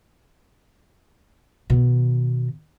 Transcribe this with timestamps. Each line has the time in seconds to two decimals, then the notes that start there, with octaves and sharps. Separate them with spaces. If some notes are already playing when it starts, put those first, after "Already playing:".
1.70 B2 D#3